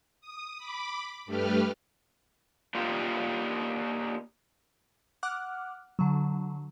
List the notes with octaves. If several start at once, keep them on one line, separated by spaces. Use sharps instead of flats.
D#6
B5 D6
G2 A3 G4 B4 F6
A#3 D4 D#4 F4 G4
F#5 D6 F6 F#6
D3 F#3